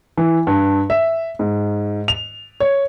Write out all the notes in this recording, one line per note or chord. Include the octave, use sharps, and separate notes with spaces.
E3
G2
E5
G#2
F7
C#5